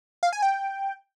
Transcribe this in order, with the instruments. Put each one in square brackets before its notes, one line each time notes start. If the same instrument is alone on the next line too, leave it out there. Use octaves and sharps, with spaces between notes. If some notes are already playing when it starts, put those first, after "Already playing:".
[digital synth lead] F5
G#5
G5